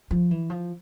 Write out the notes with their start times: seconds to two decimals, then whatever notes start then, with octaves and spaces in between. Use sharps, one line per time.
0.11 F3
0.31 E3
0.50 F3